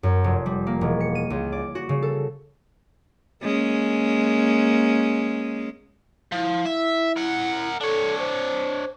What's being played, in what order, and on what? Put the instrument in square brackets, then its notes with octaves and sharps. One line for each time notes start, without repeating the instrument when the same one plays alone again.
[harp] F#2
F1
G3
A#3
E1
C#7
D#7
C#2
D5
F#4
C#3
A4
[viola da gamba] G#3 A#3 C#4
[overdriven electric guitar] F3 [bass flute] E4
[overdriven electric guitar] E5
A#4 F#5
[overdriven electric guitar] D4 C#5 [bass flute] A4
[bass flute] C5